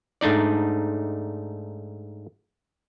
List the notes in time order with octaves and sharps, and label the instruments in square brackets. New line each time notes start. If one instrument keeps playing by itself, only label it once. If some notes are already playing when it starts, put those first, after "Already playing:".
[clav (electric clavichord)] G#2 A3 D4 D#4 D5